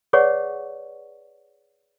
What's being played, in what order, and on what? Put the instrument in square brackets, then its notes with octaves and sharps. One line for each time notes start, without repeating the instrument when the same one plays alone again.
[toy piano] G#4 B4 C#5 D5 F#5 C#6